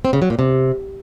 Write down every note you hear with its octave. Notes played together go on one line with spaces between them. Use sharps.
C4
C#3
F#3
A#2
C3